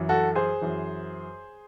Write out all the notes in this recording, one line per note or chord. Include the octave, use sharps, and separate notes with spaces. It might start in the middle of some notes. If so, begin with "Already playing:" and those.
Already playing: F#2 E3
F#4 A4
G#4 C5
F#2 E3